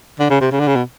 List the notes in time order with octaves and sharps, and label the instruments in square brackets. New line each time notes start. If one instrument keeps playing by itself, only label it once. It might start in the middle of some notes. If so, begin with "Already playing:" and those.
[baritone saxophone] D3
C#3
C3
C#3
D3
C#3
B2